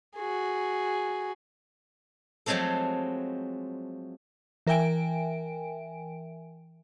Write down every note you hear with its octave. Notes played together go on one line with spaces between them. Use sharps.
F#4 G#4
F3 F#3 G#3 A3 C4 A4
E3 A#4 E5 G5 G#5 D7